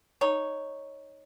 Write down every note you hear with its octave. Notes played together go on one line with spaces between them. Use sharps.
D#4 C#5